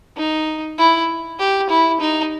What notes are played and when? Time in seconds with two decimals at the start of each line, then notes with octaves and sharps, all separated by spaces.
0.17 D#4
0.78 E4
1.39 G4
1.70 E4
2.00 D#4